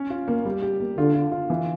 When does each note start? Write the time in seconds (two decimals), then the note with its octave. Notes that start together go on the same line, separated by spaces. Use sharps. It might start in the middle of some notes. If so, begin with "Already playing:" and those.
Already playing: C#4
0.10 F4
0.28 A#3
0.45 G3
0.62 G4
0.80 A#3
0.97 D3 F4
1.14 F4
1.32 F4
1.50 E3